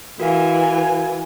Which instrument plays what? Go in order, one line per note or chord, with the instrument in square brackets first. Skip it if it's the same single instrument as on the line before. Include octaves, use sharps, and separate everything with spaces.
[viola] E3 G#5 [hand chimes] F#4 A#4 F5